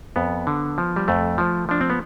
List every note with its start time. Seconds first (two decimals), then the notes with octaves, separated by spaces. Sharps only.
0.16 F2 B3
0.47 D3
0.78 F3
0.96 G3
1.08 F2 A3
1.38 F3
1.69 F3 D4
1.81 C4
1.90 B3